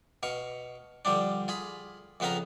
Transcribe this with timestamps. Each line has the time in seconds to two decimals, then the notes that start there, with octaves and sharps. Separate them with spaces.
0.23 B2 F5 C#6
1.05 D3 F3 G3 D4
1.48 F4 G#4 B5
2.20 F2 C#3 B3 B4 F5 A#5